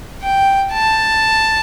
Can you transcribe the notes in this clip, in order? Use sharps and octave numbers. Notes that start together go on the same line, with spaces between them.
G5
A5